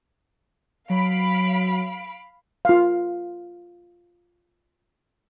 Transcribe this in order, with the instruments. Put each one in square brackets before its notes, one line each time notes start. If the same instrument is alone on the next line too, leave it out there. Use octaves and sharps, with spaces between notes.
[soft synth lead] F#3 [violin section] F5 B5 D7
[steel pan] F4 F5